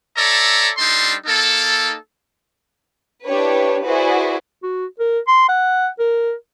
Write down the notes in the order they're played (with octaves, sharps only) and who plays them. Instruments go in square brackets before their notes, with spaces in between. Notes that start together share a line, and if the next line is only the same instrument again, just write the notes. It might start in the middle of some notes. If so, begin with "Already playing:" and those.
[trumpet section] A4 C#5 D5 E5 A#5
G3 D4 D#4 A4 C6
A#3 D#4 A4
[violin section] D4 E4 G4 B4 C#5
E4 F#4 G#4 B4 C5 D5
[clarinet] F#4
A#4
C6
F#5
A#4